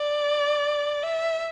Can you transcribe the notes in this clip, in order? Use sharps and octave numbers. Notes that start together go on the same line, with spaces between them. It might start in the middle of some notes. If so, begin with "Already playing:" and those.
Already playing: D5
E5